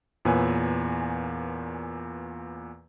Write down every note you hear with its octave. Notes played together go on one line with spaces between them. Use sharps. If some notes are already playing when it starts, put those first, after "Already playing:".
E2 A#2 B3 B4 C#5 G#5